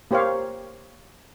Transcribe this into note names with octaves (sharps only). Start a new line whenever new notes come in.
A#3 G4 C5 C#5 F5